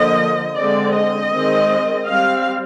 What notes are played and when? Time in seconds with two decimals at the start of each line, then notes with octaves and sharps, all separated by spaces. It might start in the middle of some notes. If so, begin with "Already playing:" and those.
Already playing: D3 F3 A#3 D#5
0.56 D3 G#3 C4 D5
0.95 D#5
1.32 D#3 G#3 C4
2.07 G3 C4 F5